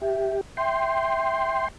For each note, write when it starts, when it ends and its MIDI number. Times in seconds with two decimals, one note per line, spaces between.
0.02 0.41 67
0.02 0.36 76
0.57 1.65 76
0.57 1.68 79
0.57 1.68 84